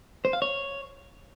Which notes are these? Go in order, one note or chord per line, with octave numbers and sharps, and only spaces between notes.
C5
F5
C#5